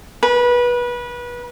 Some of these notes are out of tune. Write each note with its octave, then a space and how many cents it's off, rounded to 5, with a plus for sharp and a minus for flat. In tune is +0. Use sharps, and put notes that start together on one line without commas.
B4 -25